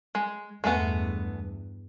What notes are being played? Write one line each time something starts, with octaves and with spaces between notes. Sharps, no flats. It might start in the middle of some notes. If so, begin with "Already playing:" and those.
G#3
E2 G2 G#3 A3 B3